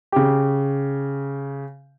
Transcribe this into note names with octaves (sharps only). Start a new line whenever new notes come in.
C#3 G4